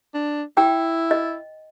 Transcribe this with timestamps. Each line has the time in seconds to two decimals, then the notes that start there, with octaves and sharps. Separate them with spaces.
0.15 D4
0.57 E4 G5
1.11 D#5